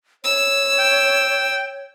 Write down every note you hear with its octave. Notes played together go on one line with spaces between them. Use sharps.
C#5 E6
G5